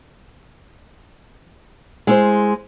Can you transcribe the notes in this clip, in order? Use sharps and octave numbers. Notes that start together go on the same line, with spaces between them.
G#3 E4 C5